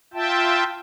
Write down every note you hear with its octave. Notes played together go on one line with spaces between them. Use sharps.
F4 E5 G5 A5